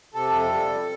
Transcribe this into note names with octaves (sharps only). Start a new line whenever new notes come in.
C3 A4
F2
G3